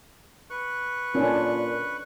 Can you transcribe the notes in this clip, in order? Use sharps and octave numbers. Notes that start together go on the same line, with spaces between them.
B4 C#6 F#6
A#2 C#4 D4